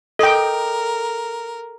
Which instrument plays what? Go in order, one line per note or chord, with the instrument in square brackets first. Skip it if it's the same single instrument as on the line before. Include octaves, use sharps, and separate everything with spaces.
[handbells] A4 [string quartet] A#4 [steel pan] D#5 G5